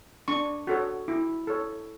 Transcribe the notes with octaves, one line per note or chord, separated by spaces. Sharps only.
D4 C#6
F#4 A4 C#5
E4
A4 C#5